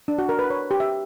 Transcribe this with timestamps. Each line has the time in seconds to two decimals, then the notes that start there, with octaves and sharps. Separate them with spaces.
0.08 D4
0.19 F#4
0.29 A#4
0.39 B4
0.50 C#5
0.71 G4
0.80 E5